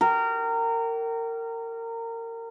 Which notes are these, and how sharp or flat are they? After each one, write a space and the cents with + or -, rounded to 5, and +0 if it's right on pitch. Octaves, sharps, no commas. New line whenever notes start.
G4 -35 A#4 -25